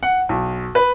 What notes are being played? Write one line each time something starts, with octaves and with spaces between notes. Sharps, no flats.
F#5
B1
B4